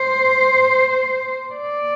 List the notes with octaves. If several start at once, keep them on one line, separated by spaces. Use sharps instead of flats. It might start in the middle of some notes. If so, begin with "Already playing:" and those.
Already playing: C5
D5